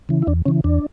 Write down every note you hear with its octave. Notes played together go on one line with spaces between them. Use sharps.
C#3 E3
E4
E2 D4
C#3 E3 C#4
E2 D4